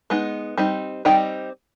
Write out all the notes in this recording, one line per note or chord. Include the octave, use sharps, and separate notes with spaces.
G#3 B3 D#4
G3 C4 D#4
G3 C4 D#4 G5